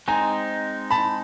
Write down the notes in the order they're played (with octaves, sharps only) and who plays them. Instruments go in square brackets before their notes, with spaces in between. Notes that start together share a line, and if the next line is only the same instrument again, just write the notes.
[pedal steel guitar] G#3 C4 D#4 [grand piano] G#5 A#5
[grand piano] A5 B5